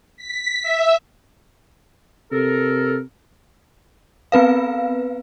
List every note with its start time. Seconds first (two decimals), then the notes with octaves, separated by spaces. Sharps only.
0.17 B6
0.63 E5
2.32 C3 A4 A#4
4.32 B3 C4 B4 F5